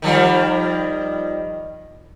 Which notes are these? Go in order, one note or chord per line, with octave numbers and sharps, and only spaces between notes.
D#3 F3 G3